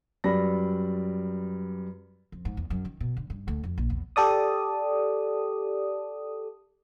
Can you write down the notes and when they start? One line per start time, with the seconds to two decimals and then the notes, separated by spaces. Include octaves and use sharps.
0.24 F#2 G3 B4 D5 B5 A#6
2.32 F2
2.45 G#2
2.57 E2
2.70 F#2
2.85 D#3
3.00 B2
3.17 D3
3.30 G2
3.48 D2
3.64 F2
3.78 A#1
3.90 E2
4.16 G4 A4 D5 D#6